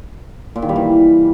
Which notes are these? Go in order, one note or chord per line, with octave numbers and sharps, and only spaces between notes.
A#2
D#3
G3
E3